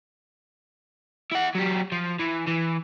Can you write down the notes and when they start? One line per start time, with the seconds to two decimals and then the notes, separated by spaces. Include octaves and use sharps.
1.32 E4 F#5
1.55 F#3 G4
1.92 F3
2.20 E3
2.48 E3